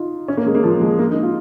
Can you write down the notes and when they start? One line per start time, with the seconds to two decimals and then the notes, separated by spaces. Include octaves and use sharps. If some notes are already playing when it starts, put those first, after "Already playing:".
Already playing: D#4 F4
0.28 C#4
0.37 A#3
0.46 G#3
0.55 A#3
0.64 F3
0.81 G#3
0.99 A#3
1.11 D#4
1.23 F4